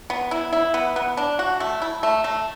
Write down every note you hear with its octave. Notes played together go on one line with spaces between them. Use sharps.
B3
E4
E4
B3
B3
D4
F#4
A3
E4
A3
A3